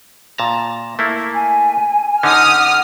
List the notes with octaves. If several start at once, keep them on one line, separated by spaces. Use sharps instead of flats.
A#2 A5 A#5
A3 A#3 E4
G#5
D3 C#4 D#4 F#5 D#6 F6